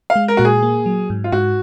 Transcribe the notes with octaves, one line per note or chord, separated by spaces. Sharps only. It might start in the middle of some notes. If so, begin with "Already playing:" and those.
F5
G#3
A#4
A#2 F#4
G#4
A#3
F#3
G#2
F4
G#2 F#4